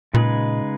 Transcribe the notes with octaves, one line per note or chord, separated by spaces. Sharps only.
A#2 C#3 G#3 D#4 G#4 B4